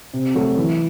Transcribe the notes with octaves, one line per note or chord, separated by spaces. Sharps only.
C3
F#3 A3
E3